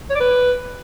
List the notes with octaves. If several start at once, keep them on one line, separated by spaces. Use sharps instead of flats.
C#5
D5
B4